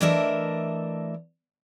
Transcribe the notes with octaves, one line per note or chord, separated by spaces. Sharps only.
E3 A3 D4 A#4 D#5 E5